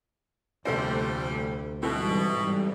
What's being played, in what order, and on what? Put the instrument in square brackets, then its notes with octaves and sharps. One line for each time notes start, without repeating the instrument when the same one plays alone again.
[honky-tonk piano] F1 A4 C5 [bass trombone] D2 [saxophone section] A#2 G3
[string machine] G#2 E3 G3 [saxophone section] B2 [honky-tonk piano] C4 E4 A4